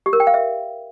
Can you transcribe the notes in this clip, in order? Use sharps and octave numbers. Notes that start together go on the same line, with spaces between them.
G4
A#4
G5
F5
E5